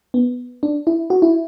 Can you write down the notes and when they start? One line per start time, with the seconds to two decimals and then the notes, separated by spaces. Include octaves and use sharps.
0.14 B3
0.63 D4
0.87 E4
1.10 F#4
1.22 E4